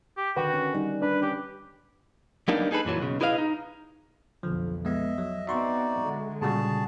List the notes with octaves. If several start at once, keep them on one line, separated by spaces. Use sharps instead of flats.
G4
D3 D#3 F#4 B4 F#5 G5
C#4
G3 D#4
D4 B4
C#4 G4
F#3 G3 A#3 B3 D4 D#4
D#4 G#4 A4 B4
F#2 A#2 E3 F#3
B1 C#3
E4 G#4 B4 D#5 F5
D#4
B1 F2 D3 F3
G#3 B3 D#5 E5
F#3
B3 C4 D#4 F#4 D5 E5 C6 C#6
D3 G#3
A#2 C#3 G3 F#4 G#4 A5